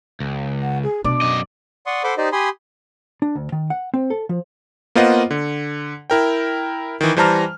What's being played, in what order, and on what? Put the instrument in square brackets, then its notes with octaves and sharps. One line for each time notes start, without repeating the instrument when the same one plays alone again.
[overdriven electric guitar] C#2
[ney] F#5
G#4
[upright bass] B2 [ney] D4 [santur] D5
[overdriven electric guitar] F#2 D#5
[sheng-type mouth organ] D5 F#5 C6 C#6 D#6
A4 C5 F#5 B5 C6 D6
D#4 G4 C5 D5 D#5
G4 G#5 B5 C6 D#6
[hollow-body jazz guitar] D4
D2
D#3
F#5
C4
A4
F3
[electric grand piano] A#3 B3 F4 C5 D#5 F#5
D3
E4 A#4 G5
D#3 E3
E3 G3 C5 A5 A#5 F6